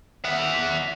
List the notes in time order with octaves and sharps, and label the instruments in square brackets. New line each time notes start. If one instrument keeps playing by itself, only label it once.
[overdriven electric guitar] E5 F#5